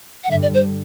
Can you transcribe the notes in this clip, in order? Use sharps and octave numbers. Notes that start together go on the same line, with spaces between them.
F#5
G2 D3 G3 E5
D5
C5